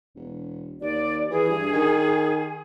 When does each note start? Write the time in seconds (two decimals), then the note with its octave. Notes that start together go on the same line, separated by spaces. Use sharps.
0.15 E1
0.81 D#2 D5
1.31 E3 G#4
1.49 G2
1.73 D#3